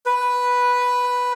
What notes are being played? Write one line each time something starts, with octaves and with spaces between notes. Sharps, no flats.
B4